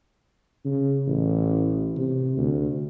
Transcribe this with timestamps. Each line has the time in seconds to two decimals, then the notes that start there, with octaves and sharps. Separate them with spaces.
0.65 C#3
1.07 A1
1.96 C3
2.37 D2